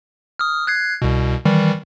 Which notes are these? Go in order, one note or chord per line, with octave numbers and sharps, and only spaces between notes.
D#6 F6
F#6 G#6 C7
C2 B2
D#3 E3 G3